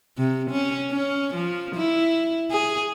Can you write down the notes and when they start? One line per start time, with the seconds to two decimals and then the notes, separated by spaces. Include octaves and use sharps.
0.18 C3
0.51 C#4
0.91 C#4
1.35 F3
1.76 E4
2.51 G#4